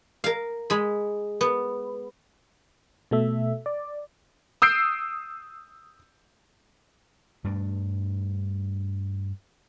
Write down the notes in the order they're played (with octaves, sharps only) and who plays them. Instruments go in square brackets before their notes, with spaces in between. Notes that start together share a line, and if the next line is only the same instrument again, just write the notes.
[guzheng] A#4 F5
G#3 B5
B3
[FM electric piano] B2 A3 E5
D5
[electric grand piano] D#6 E6 G6 C7 D7
[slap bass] G2 G3 A3 D4